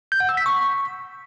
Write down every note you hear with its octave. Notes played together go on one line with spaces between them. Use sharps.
G6
F#5
E6
B6
C#6